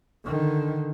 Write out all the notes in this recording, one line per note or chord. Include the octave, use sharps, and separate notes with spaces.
D3 D#3